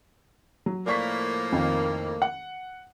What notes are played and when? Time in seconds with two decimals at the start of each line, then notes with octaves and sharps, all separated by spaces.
0.66 F#3
0.86 A2 F3 A#3 D5 C#6 B6
1.52 F2 D#3
2.22 F#5